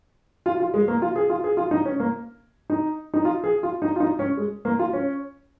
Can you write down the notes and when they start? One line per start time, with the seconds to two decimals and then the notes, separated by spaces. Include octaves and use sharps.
0.46 F4
0.60 F4
0.74 G#3
0.88 A#3
1.02 F4
1.16 G#4
1.30 F4
1.44 G#4
1.57 F4
1.71 D#4
1.85 C#4
2.00 A#3
2.70 D#4
3.14 D#4
3.25 F4
3.44 G#4
3.63 F4
3.82 D#4
3.96 F4
4.00 D#4
4.19 C#4
4.37 G#3
4.65 A#3
4.79 F4
4.93 C#4